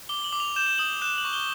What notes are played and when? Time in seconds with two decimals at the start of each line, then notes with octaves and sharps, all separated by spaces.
0.09 D6 G7
0.24 F#7
0.33 D6
0.40 F7
0.56 G6 E7
0.67 E7
0.78 D#6 F#7
1.02 F#6 E7
1.18 F#7
1.25 C#6
1.33 G7